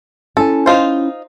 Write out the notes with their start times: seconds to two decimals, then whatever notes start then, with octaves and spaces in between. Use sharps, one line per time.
0.37 C#4 E4 A4 G#5
0.66 D#4 F4 C5